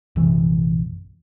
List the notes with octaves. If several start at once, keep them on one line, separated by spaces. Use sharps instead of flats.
A#1 F#2 C3 E3